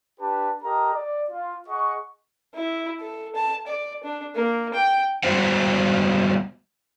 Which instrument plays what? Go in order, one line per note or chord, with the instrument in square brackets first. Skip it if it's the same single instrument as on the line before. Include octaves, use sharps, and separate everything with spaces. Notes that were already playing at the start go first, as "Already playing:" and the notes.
[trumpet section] D4 G4 B4 A5
G4 A4 A#4 D#5 A#5
D5
F4
G#4 D#5 F#5 C#6
[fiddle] E4
A4
A5
D5
D4
A#3
G5
[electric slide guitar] G3 G#3 B3 F#4 C5 F#5